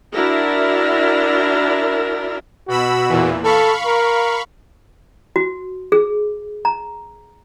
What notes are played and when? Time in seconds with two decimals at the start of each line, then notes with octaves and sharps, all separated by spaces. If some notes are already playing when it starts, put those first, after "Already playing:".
0.13 D4 E4 F#4 A#4
2.68 B2 F#4 B5 E6
3.09 E2 A#2 E3
3.44 A4 F5 B5 C#6
3.86 A#4
5.36 F#4
5.92 G#4
6.65 A#5